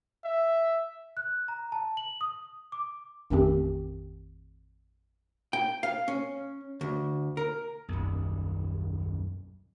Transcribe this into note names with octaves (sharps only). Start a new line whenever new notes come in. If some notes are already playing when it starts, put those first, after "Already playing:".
E5
F#6
A#5
A5
F#7
D#6
D6
A1 F2 D#3 A3 C4 G4
G5
F5
C#4
D2
A#4
D#1 B1 F#2